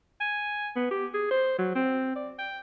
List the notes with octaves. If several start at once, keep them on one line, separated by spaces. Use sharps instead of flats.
G#5
B3
G4
G#4
C5
F#3
C4
D5
G5